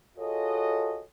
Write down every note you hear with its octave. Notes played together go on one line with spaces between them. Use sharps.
F4 F#4 G#4 A4 C#5 D#5